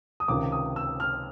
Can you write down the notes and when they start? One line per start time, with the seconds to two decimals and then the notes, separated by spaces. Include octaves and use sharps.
0.20 D#6
0.28 C#2 C3 D#3 D6
0.52 D#6
0.76 E6
1.00 F6